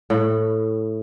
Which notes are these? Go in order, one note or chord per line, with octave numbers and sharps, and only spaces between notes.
A2